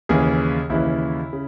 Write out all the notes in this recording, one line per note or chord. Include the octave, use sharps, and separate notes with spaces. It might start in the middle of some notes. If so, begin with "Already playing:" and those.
D#2 C#3 E3 G#4
D#2 C#3 E3 E4
C#3